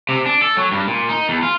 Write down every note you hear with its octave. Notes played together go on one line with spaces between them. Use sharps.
C3
D4
A4
F#3
G2
A#2
D#4
E2
F4